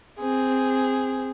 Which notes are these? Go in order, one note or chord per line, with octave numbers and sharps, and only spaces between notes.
C4 G#4